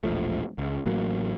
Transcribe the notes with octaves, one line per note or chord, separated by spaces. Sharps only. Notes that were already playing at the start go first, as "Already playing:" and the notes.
E1 A#1 F3 A3
C#2
A1 A2 F#3 A#3